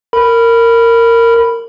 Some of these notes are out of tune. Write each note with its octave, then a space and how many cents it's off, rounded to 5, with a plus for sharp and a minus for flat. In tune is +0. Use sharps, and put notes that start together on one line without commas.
A#4 -15 B5 +0